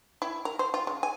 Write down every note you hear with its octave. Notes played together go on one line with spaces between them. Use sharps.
E4
A#4
C5
F4
C#3
G#5